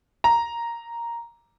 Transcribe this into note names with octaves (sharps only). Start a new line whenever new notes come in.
A#5